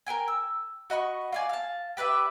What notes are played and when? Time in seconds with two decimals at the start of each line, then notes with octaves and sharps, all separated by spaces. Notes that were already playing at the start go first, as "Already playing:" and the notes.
0.07 A#4 B4 G5 G#5
0.28 E6
0.90 F#4 D#5 B5 C#6
1.32 F4 D5 G#5
1.49 F5 A5
1.97 G4 B4 D5 E5